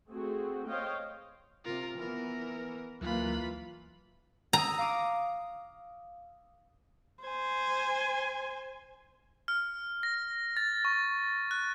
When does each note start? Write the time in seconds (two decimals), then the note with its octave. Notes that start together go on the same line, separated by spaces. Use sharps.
0.10 A3 C4 F#4 G#4
0.66 C5 C#5 D#5 F5 G5
1.65 C3 F4 A#4
1.98 E3 B3 A#4
3.01 D2 E3 F#3 A#3 F4 B5 F#6
4.53 A#5 D#6 E6 A#6
4.78 F5 D6 D#6
7.24 C5 G#5
9.48 F6
10.03 A#6
10.57 A6
10.85 C#6
11.51 F#6